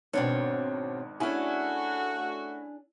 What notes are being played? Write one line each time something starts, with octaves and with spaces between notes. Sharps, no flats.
G#1 G#2 B2 C4 D4 C#5
A3 C#4 D4 E4 F#4 G#4 G#5